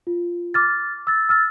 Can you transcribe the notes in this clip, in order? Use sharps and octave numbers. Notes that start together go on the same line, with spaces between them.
F4
D6 F6 A6
E6 A6
E6 F6 A6